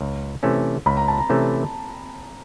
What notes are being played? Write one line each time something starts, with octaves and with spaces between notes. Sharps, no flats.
C#2
C3 E3 A3 C#4
C#2 B5
A#5
A5
A#5
C3 E3 A3 C#4